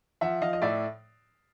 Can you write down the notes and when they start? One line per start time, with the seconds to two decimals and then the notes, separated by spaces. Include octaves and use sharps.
0.21 F3 E5 F#5
0.42 F3 D#5 F5
0.53 D#5
0.62 A2 D5 E5